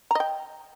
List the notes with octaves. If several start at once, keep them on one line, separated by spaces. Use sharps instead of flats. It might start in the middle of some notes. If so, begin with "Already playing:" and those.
D#5 G5 A#5